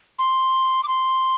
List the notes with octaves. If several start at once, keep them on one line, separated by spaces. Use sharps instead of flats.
C6
D6
C6